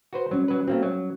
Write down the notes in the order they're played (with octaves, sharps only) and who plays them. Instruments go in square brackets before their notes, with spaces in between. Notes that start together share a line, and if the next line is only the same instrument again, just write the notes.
[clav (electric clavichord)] F#4 B4 C5
[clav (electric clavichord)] F#3 [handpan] G3 C#4
[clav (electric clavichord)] F#3 B4
[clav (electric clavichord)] A3 A#3 C4 [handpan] F#4
[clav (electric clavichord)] F#3